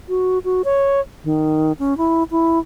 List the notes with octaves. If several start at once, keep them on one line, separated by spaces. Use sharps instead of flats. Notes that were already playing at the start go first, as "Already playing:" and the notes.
F#4
F#4
C#5
D#3
C#4
E4
E4